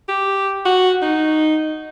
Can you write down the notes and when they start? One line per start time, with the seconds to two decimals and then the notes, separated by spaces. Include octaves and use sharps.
0.09 G4
0.65 F#4
1.02 D#4